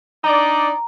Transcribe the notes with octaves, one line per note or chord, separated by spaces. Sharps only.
D4 D#4 D5 A#5